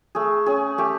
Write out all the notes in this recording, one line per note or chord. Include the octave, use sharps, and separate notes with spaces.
A3 G#4
C#4 G#4
A3 G4